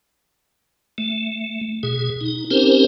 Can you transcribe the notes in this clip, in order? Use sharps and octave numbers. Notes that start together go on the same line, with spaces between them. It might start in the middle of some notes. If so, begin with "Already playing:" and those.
A3
B2 G#4
D#4
C4 C#4 D#4 G4 A#4 C5